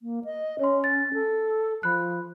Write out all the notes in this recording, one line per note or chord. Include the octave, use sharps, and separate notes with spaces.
A#3
D#5
C#4 C#5 C6
A6
A4
F3 B5 F#6